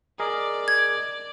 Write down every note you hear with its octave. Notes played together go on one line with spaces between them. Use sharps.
G#4 A#4 D5 D#5
G#6